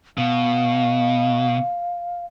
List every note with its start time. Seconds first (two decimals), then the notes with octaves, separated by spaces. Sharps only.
0.18 B2 F5